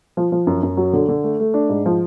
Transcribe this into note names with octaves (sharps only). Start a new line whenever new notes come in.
F3
F3
F#2
F#2
F#3
D3
D3
A3
A3
D4
G#2
F3